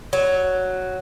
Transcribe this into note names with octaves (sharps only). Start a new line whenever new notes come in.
F#3